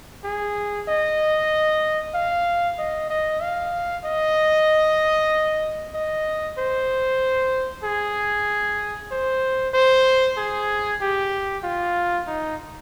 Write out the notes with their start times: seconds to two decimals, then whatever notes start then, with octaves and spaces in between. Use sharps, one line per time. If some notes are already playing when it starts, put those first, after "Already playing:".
0.24 G#4
0.88 D#5
2.14 F5
2.78 D#5
3.10 D#5
3.41 F5
4.04 D#5
5.94 D#5
6.58 C5
7.84 G#4
9.12 C5
9.74 C5
10.37 G#4
11.01 G4
11.64 F4
12.27 D#4